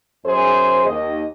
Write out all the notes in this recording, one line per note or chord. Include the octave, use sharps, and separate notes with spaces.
F#2 G#4 C5
D#2 D#5